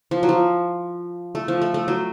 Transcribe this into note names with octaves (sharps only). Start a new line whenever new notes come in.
F3
F#3
F3
A3
F3
A3
A3
F#3